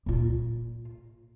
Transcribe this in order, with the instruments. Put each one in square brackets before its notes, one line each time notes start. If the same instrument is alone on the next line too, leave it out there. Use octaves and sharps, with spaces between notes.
[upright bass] A#2 F4